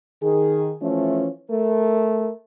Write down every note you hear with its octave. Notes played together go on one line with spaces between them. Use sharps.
D#3 G#4
E3 F3 A3 C#4
A3 A#4